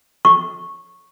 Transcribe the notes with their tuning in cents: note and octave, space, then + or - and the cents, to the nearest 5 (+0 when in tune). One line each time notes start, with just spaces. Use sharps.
C#6 -10